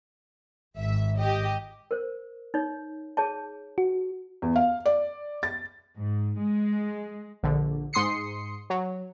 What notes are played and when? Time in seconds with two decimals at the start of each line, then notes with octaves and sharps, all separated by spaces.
0.78 G#1 E5
1.18 G4 D#5
1.91 A#4 C5
2.54 D#4 C#5
3.17 G#4 C#5 A5
3.78 F#4
4.42 E2
4.56 F5
4.86 D5
5.43 A6
5.95 G#2
6.40 G#3
7.43 A#1 D3
7.93 G#2 C6 D#6 C7 C#7
8.70 F#3